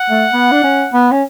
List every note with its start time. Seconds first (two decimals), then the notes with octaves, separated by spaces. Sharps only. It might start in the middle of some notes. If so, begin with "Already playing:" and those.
Already playing: F#5
0.10 A3
0.33 B3
0.52 D4
0.63 C#4
0.93 B3
1.12 C#4